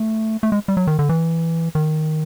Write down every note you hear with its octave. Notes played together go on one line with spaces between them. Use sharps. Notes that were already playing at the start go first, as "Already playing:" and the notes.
Already playing: A3
A3
G#3
G3
F#3
D#3
D3
E3
D#3